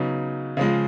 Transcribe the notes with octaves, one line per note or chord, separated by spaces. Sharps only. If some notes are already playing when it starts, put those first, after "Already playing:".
Already playing: C#3 F#3 B3 D#4
C#3 F3 G#3